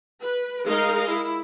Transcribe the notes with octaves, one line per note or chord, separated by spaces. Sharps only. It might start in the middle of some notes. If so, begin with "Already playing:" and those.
B4
G#3 D#4 G#4 A#4 D#5 F5
E4